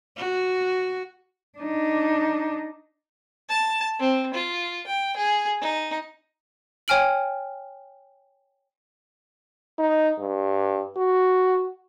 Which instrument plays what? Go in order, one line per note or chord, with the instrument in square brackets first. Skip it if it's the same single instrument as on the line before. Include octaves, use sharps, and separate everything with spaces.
[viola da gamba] F#4
[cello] D4 D#4
[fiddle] A5
C4
F4
G5
G#4
D#4
[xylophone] C#5 G5 G#5 F6 D7 F#7
[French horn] D#4
G2
F#4